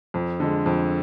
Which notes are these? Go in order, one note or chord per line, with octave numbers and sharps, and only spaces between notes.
F2
D3 G#3
F2